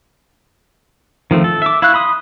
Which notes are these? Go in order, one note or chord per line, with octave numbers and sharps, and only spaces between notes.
D#3 F3 A3 C4
A4
E5 D6
E4 F5 C#6 F#6
B5 C6 D#6